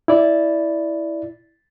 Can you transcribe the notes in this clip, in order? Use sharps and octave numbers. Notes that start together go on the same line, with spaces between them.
E4 D5